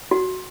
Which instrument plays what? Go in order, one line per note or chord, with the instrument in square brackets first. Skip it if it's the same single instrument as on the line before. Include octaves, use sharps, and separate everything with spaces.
[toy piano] F#4